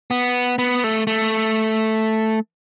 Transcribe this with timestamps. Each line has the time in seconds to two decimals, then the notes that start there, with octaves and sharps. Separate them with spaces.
0.11 B3
0.59 B3
0.84 A3
1.07 A3